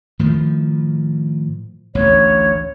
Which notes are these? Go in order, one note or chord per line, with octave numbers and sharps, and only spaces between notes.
A2 D#3 F3
A1 D2 C#5